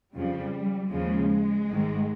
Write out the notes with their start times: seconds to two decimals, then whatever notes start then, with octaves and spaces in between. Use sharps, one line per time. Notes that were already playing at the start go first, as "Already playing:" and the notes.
0.14 F2 C#3 F3 G3
0.91 D#2 C#3 F3 G#3
1.68 G#1 G#2 D#3